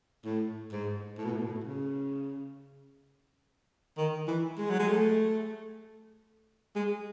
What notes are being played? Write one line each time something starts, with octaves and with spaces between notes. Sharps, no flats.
A2
G#2
A2
B2
A2
B2
A2
C#3
D#3
E3
G#3
F#3
G#3
A3
G#3